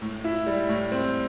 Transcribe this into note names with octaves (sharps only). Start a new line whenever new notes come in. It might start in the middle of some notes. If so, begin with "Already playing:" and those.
A2
E4
G3
A2
C4